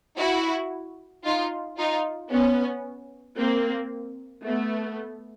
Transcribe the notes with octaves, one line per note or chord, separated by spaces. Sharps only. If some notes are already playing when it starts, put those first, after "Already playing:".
E4 F#4
D#4 F4
D#4 F4
B3 C#4
A#3 C4
A3 B3